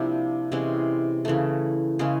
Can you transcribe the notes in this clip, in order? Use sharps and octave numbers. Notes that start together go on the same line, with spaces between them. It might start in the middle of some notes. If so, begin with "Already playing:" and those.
Already playing: C3 F3 A#3 D4 E4
C3 E3 G#3 C#4
C#3 E3 A3
C#3 E3 G#3 C#4